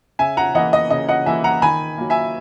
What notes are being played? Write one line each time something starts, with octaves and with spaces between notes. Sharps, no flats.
C#3 E5 G#5
F#5 A#5
E3 A#3 D#5 F#5
D#5
C#3 D#5
D#5 F#5
E3 A#3 E5 G#5
F#5 A#5
D#3 G#5 B5
F#3 A#3
E5 G#5